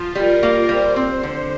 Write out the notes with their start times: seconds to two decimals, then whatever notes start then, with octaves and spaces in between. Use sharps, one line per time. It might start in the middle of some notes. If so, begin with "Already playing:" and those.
Already playing: F3 F4
0.15 G3 A#4
0.43 A#3
0.69 G3 C5
0.96 C4
1.23 D3